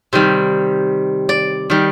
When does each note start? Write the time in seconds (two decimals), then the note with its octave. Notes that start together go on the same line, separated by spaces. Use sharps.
0.13 C3 D#3 G3
1.29 D5
1.70 D#3 G3